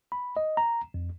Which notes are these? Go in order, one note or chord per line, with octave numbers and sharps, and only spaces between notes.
B5
D#5
A#5
F2